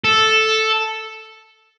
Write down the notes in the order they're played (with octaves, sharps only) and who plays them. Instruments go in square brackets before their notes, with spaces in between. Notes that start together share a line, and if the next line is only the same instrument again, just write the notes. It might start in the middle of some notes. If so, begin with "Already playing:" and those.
[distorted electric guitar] A4